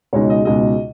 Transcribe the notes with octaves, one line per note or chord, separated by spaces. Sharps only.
C#2 B2 G#3 D#4 C#5
D#5
C#2 B2 G#3 D#4 D#5